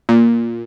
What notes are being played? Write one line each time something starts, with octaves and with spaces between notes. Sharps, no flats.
A#2